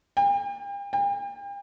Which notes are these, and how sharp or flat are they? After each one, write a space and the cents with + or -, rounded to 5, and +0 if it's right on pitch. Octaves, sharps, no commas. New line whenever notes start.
G5 +40
G5 +40